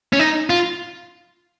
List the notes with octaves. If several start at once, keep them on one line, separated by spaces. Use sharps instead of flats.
C#4
D#4
F4